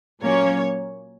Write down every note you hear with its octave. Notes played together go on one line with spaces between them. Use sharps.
A#2 F#3 A#3 C#4 C#5